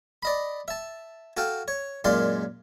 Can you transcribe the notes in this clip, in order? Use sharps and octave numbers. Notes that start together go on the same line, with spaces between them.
D5 D#5 B5
E5 A5
F#4 A4 F5 G5
C#5
F#2 A#2 G#3 D5 F5 C6